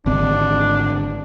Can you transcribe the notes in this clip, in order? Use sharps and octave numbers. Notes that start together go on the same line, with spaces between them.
G#1 D3 C4 D4